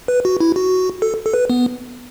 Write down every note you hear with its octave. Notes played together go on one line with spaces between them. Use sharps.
B4
F#4
E4
F#4
A4
A4
B4
B3